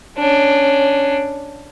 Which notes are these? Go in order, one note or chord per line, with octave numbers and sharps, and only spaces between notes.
C#4 D4